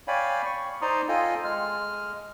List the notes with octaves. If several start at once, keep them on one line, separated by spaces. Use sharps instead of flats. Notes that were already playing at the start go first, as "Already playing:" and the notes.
C#5 D5 F5 G5 G#5 B5
C#6
D#4 C5 D5 A#5 C6 D#6
F4 A4 D#5 F5 G5 G#5
G#3 F6